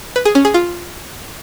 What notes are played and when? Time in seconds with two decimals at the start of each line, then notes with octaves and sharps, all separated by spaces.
0.16 B4
0.25 G#4
0.35 C#4
0.45 G#4
0.54 F4